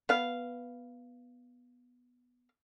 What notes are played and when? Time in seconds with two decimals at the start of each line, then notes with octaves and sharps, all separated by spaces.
0.09 B3 F5